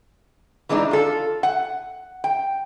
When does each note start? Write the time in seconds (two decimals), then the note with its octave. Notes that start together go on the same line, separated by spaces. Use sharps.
0.69 E3 G#3 B3 D4 D#4
0.91 F4 A4
1.43 F#5
2.24 G5